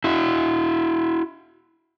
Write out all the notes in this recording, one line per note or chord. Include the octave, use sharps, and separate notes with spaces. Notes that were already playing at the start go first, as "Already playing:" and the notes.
E4 F#4